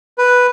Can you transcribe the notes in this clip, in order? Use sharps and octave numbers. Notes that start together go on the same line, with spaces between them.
B4